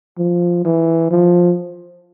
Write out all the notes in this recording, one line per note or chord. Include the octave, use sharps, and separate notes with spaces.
F3
E3
F3